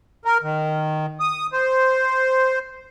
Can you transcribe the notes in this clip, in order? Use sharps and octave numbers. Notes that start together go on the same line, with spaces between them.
A#4
D#3
D#6
C5